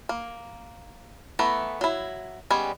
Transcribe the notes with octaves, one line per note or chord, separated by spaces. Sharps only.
A#3
E3 A3 B3 A#5
F#3 E4
G3 G#3 B3 C#4 G#5